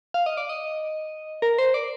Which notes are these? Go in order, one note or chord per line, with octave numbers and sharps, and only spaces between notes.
F5
D#5
D5
D#5
A#4
C5
D5